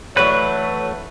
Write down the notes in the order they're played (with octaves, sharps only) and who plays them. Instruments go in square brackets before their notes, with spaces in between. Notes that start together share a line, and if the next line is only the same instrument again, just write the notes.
[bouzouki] E3 F#3 A3 [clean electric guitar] B4 [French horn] C#5